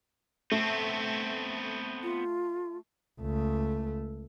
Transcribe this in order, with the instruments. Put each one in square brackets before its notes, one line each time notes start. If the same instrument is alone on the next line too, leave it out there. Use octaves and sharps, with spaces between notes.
[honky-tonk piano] A3 [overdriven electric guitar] B3 C4
[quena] F4
[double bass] C#2 A3